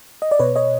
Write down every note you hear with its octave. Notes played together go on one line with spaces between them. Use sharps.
D#5
D5
B2 B4 C#5
C#5 D#5